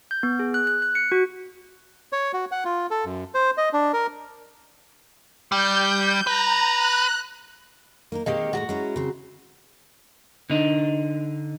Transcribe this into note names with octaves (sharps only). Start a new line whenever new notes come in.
G6
B3
G#4
F#6
F#6
F#6
C#7
F#4
C#5
F#4
F#5
F4
A4
F#2
C5
D#5
D4
A#4
G3 G6
B4 A#5
F#6
A#3 D#4 A#4
D#3 G#3 A#3 C4 D#4 G4
A2 G#3 F#4 A#5
G#3 C#4 E4
C#3 C4
D3 D#4